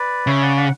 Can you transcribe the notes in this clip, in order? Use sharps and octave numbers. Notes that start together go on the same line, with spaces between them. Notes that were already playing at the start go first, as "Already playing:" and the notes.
Already playing: B4 D5
C#3 C#5 E5
D5 F#5
D5 F#5